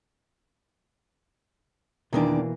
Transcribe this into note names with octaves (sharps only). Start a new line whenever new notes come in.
E2 B2 D#3 E3 A#3 D4